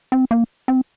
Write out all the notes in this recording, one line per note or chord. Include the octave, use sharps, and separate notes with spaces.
C4
A#3
C4